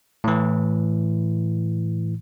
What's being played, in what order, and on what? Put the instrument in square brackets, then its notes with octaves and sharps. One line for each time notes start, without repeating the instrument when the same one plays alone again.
[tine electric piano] A2 E3